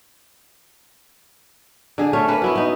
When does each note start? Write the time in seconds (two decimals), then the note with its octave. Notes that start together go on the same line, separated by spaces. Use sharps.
1.98 D3 G#4
2.13 A3 C#4
2.28 A#3 C#4 B4
2.42 B3 E4 F#4
2.55 B3 D#4